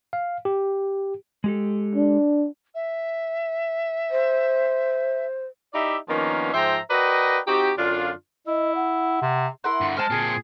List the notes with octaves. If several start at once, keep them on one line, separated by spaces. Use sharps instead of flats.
F5
G4
G#3 G4 A4
D4
E5
C5
D#4 E4 G4 D5 E5
D#3 F3 A#3 B3 C#4 D4
G#2 F3 C5 E5 G5 A#5
F#4 A#4 B4 D5 D#5 G5
C4 D#4 F#4 G4
F#2 D3 D4 F4
E4 D#5
F#5
C3
E4 A#4 F#5 C6
G2 D3
G#3 C5 A5 F6
A#2 C4 G#4